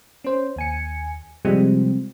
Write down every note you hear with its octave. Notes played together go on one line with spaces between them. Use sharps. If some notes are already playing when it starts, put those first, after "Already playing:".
C#4 C5
D#2 G#5 C#7
C3 F3 G3 G#3 C4